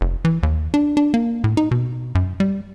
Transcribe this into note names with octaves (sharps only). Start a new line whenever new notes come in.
F1
E3
D#2
D4
D4
A#3
A2
D#4
B2
F#2
G3